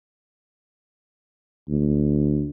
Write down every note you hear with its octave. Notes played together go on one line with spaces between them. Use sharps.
D2